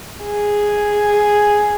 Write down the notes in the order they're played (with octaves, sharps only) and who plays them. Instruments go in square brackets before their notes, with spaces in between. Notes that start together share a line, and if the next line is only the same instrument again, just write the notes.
[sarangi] G#4